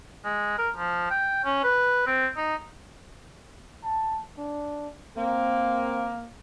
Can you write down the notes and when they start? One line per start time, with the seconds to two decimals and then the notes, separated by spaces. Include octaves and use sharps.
0.25 G#3
0.58 A#4
0.77 F3
1.10 G5
1.44 C#4
1.64 B4
2.06 C4
2.37 D#4
3.84 A5
4.38 D4
5.16 A#3 C4